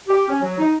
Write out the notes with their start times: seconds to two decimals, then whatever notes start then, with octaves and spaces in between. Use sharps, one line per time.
0.08 G4
0.29 C#4
0.41 F#3
0.58 D#4